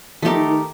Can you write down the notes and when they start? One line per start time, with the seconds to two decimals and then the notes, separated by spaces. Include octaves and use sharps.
0.22 F3 A3 D#4 G4 A#4
0.36 D#3
0.47 D#3